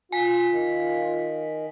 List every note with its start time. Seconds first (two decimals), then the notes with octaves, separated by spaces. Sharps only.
0.12 F4 G#5 B6
0.50 D#3